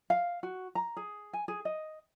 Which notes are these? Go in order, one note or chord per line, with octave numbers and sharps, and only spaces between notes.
F5
F#4
A#5
G#4
G#5
G#4
D#5